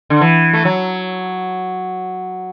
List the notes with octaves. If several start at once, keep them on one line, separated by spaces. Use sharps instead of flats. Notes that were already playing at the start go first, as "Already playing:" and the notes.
D3
E3
A3
F#3